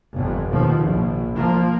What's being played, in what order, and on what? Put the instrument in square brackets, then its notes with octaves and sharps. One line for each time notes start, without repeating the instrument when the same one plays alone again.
[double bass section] G1 F2
D#2 B2 F3
A#1
F3 A#3